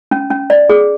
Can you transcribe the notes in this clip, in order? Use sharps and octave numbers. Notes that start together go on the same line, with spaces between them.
C#4
C#4
D5
G#4